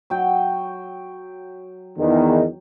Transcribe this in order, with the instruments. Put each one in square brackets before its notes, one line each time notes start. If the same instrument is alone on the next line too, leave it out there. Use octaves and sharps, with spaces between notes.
[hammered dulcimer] F#3 G5
[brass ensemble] E2 D#3